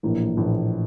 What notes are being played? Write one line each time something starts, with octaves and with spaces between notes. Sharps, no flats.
A#1 A2 E3 A#3
A#1 A2 E3 A#3